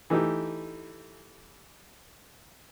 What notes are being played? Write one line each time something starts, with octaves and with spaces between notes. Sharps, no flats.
E3 A3 D#4 G4